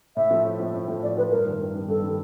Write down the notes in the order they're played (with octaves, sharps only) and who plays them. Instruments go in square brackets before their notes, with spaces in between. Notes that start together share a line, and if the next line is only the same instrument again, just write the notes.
[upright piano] A2 [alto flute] E5
[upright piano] F3 A3
A2
F3 A3
A2
F3 A3
[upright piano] A2 [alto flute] D5
[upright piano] F3 A3 [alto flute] B4
[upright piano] G2 [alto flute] A#4
[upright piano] D#3 G3 B3
G2
D#3 G3 B3
[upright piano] G2 [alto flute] A4
[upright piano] D#3 G3 B3